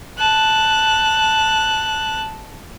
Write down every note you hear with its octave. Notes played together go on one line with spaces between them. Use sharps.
A5 F#6